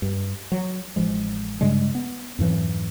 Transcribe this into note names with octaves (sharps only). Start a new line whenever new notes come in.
G2
F#3
A1 F3 G#3
G2 C#3 G3 G#3
B3
F2 G#2 E3 F#3